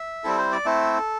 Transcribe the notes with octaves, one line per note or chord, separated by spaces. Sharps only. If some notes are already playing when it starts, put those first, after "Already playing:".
Already playing: E5
G3 C4 E4 A4
C5
D5
A3 C4 E4 A4